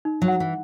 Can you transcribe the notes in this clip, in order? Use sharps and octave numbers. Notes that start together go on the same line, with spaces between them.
D#4
F#3
F#5
E3